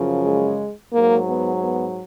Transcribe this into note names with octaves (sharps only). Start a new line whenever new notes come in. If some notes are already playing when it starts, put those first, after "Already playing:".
Already playing: F#2 C#3 F3
G#3
G#2 F#3 A#3
B3
B3